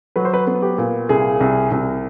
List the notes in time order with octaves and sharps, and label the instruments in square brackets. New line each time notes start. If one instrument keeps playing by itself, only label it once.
[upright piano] F#3 B4
C5
B4
B3
G4
A#2
C2 G#4
C2
C2